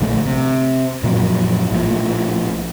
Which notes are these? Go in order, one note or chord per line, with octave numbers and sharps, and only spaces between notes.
A#1 D3 A3
C3
F#2 A#2 F3 F#3
A#1 A2 F3